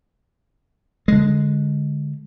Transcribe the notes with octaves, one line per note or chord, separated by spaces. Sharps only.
D3 G#3